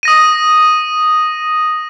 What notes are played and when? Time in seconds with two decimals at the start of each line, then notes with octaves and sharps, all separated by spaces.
0.03 D#6 A#6 D#7